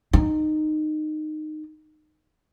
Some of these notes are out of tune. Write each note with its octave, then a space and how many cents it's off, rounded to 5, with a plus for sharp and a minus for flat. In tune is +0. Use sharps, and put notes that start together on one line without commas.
D#4 -20